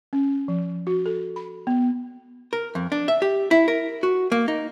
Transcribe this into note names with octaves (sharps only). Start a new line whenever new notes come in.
C#4
F3
F#4
A4
B5
B3
A#4
F2
D4
E5
G4
E4
A#4
F#4
A#3
D#4